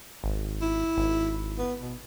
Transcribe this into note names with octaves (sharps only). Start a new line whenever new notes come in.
G#1
E4
G#1
B3
B2